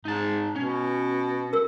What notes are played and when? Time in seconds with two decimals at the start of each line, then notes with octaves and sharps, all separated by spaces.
0.05 G#2 D#4 A5
0.56 B2 C#4
1.53 A#4 E6